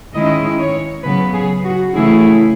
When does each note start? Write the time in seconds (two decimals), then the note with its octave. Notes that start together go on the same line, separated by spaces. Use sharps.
0.14 D#3 G#3 C#4 E4 D#5
0.59 C#5
1.04 C#3 F#3 B3 B4
1.33 G#4
1.64 F#4
1.93 C#3 E3 A3 E4 G#4